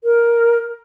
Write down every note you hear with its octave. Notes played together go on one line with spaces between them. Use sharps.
A#4